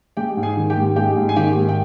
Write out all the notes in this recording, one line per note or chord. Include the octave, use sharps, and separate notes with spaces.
G#3 G4 G5
G#2
G#4 G#5
D#3
G4 G5
G#2
G#3 G4 G5
G#2
G#5
D#3 G4 G5
G#2
G5